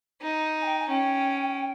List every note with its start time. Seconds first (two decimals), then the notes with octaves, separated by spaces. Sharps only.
0.21 D#4
0.61 G#5
0.65 G5
0.79 G#5
0.89 C#4 G5